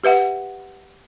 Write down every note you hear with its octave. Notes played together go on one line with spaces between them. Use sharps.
G4 B4 E5 F#5